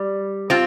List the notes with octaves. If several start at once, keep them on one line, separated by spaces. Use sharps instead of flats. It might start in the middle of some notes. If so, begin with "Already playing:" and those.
Already playing: G3
C4 F4